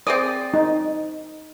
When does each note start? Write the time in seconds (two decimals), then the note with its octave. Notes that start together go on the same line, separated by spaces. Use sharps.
0.07 C4 G#4 D5 D#6
0.54 D#4